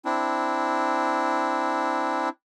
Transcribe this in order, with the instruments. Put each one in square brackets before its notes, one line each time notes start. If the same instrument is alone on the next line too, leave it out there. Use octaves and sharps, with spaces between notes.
[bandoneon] C4 D4 E4